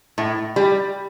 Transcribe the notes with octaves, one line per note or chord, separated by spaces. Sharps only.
A2
G3